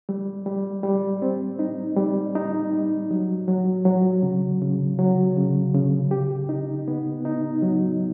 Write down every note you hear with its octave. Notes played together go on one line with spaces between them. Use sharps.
G3
G3
G3
C4
D#4
G3
D#4
G3
F#3
F#3
F#3
C#3
C#3
F#3
C#3
C#3
G4
D#4
B3
D#4
F#3